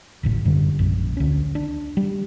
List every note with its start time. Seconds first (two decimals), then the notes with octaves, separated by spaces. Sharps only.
0.23 D1 G#1 A2
0.45 F#2 D3 G3
0.79 A#1 F#2
1.17 D2 C#4
1.55 D4
1.97 G3